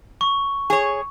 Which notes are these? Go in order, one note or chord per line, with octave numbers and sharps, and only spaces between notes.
C#6
G#4 C#5